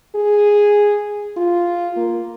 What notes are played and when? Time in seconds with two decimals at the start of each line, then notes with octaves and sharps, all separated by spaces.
0.15 G#4
1.37 F4
1.96 A#3